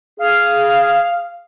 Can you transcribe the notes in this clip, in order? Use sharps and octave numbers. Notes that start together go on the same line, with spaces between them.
G#4 F5